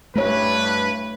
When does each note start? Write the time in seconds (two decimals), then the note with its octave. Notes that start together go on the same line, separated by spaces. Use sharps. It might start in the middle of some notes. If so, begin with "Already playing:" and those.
0.16 G2 A3 B4 C#5